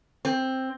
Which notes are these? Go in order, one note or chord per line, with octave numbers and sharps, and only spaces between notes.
C4